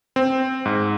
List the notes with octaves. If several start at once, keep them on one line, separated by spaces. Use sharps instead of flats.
C4
G#2